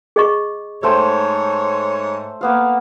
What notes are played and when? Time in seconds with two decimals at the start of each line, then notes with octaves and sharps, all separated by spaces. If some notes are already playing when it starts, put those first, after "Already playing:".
0.16 G#4 D#5 C#6
0.83 G#2 A3 C5 C#5 G5
2.41 A#3 B3 F5